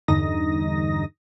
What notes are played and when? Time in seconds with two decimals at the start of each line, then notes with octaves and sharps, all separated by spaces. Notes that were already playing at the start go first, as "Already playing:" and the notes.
0.08 E2 G2 D3 D#4 D#6 A#6